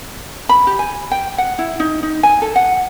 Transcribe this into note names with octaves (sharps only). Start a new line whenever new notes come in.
B5
G4
G#5
G5
F#5
E4
D#4
D#4
G#5
A4
F#5